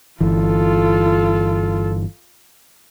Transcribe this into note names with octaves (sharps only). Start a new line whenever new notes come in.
G1 E3 F4 A4